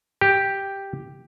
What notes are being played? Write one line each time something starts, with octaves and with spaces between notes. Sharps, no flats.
G4